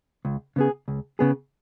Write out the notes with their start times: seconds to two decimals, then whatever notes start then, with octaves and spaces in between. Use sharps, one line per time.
0.25 C#2
0.56 C#3 B3 G#4
0.88 C#2
1.19 C#3 B3 G#4